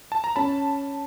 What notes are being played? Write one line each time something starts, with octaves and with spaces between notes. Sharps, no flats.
A5
A#5
C#4 A5 B5